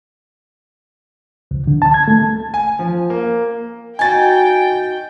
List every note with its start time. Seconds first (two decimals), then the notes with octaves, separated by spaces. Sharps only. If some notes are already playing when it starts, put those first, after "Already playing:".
1.51 C#2
1.67 D3
1.82 A5
1.94 G#6
2.08 A3
2.54 G#5
2.79 F3
3.10 A#3
3.99 D#4 F#4 G5 G#5 A6